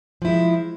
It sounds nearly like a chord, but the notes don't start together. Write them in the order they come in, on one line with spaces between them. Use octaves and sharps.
F3 E4 G#3